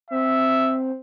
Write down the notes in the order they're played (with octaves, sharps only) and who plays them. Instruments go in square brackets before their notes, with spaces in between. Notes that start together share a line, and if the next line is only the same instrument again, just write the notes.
[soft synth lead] C4 [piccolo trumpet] E5